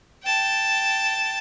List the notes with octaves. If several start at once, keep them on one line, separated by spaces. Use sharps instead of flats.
G5 A5